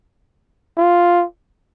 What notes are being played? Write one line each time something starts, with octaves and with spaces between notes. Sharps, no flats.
F4